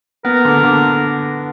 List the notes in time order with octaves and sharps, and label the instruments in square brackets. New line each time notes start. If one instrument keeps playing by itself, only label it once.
[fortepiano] B3 [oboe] A#4
[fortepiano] D3
D3